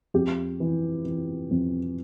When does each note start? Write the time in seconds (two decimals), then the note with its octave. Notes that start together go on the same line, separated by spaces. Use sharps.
0.14 F2 G4
0.60 E3
1.05 E3
1.51 F2